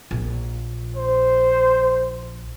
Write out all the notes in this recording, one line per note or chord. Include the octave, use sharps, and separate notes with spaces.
A#1
C5